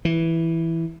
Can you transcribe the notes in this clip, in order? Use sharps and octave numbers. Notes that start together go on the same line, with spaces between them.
E3